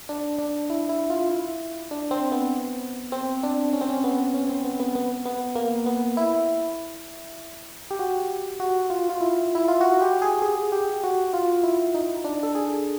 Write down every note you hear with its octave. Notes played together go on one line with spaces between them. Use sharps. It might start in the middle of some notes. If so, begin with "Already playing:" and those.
D4
D4
E4
E4
F4
E4
D4
C4
B3
C4
D4
C#4
C4
C#4
B3
C#4
C4
B3
B3
B3
B3
A#3
B3
E4
G4
F#4
F#4
F4
F4
E4
E4
F4
F#4
G4
G#4
G#4
G4
F#4
F4
E4
D#4
D4
A4
G#4